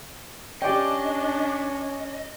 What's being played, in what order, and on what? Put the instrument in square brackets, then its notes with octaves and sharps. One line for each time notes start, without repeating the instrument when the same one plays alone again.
[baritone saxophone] C#4 [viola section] D4 [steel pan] G4 D5 G5 [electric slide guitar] D#5